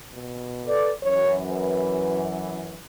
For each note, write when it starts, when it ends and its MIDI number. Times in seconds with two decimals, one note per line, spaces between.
0.14 0.78 47
0.67 0.91 69
0.67 0.91 71
0.67 0.91 74
1.03 2.79 42
1.03 2.79 52
1.03 1.36 73
1.52 2.42 71